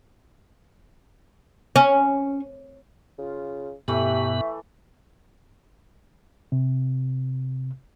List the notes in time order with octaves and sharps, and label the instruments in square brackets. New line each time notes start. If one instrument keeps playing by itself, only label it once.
[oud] C#4
[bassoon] C#3 [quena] F4
[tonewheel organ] G2 B2 B3 [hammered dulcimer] E3 A3 [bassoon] G4 [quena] E5
[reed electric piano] C3